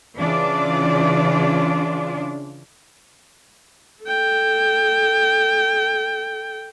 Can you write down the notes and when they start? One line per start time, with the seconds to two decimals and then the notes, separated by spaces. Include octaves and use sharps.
0.17 C#3 E3 D4 F4 D5
4.04 A4 G5